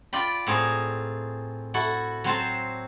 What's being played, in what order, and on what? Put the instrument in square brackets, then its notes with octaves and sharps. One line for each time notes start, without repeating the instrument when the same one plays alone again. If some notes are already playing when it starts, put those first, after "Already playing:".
[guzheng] F4 D5 G5 B5
A2 C4 G#4 A#4
E4 F#4 A4
F#3 C4 C5 A5